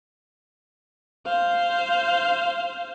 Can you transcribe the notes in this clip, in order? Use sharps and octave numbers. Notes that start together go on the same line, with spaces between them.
C5 F5